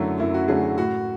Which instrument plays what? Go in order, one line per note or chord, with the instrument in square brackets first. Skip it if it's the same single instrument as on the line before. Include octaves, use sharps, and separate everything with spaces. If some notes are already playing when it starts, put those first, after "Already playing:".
Already playing: [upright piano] F#2 D3 F#3 A3 [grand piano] E4 F#4
[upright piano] F#2 [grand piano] E4
[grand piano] F#4
[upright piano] D3 F#3 A3 [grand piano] G#4
[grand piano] F#4
[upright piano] A2 [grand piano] F#4